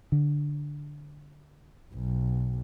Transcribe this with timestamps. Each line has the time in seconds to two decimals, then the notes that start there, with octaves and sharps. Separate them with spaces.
0.12 D3
1.94 B1